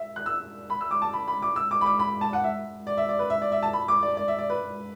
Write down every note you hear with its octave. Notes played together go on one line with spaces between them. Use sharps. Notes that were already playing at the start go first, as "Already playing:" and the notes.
Already playing: E5
F#6
E6
B5
E6
D6
A5
B5
B5
D6
E6
D6
B5
D6
B5
A5
F#5
E5
D5
E5
D5
B4
E5
D5
E5
A5
B5
D6
D5
D5
E5
D5
B4